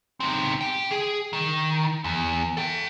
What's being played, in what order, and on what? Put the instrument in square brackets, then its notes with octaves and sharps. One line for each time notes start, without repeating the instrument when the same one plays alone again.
[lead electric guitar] C4 D#4
G4 G5
G#4
D#3
E2
A4 G5